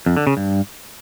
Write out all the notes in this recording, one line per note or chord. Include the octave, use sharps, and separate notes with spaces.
F2
D3
C#3
G2